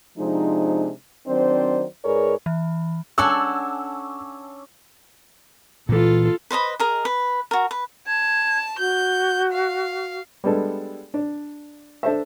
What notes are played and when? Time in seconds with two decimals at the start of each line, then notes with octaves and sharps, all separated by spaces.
0.18 C3 F3 G#3 D4 D#4
1.27 D#3 F#3 C4 D4 C5 D5
2.05 G#2 G#4 A#4 B4 C#5 D5
2.46 E3
3.18 C#4 D4 A4 F#5 G#5 E6
5.89 A#2 E3 F4 A4
6.51 B4 C5 D#5 B5
6.80 G#4 A#4 D#5
7.05 B4
7.51 F#4 A#4
7.71 B4
8.07 A5 G#6
8.78 F#4 G6
9.52 F5
10.44 G3 G#3 B3 D4 A4
11.14 D4
12.03 D4 A4 C5 E5